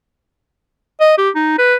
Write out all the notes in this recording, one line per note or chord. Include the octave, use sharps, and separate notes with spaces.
D#5
G4
D#4
B4